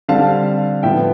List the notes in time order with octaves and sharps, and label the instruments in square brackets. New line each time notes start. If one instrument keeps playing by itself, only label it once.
[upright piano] D3 G3 C4 F5 A5
A2 F3 B3 E5 G5